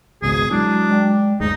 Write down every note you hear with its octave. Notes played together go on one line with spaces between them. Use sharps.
G#1 C#2 B2 G#4
F#3 G#3 D4 E4
G#3 D5 G5
G1 D#2 G#3 A3 D#4